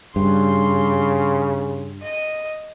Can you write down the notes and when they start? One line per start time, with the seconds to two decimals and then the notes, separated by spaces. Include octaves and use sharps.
0.16 G2 C#3 C6
2.02 D#5